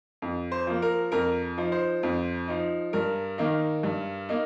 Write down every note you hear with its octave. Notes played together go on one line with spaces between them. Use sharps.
F2
C5
F3 A#3
A#4
F2 A#4
F3 D#4
C5
F2
F3 D#4
G2 A#4
D#3 A#3 D#4
G2
A#3 D#4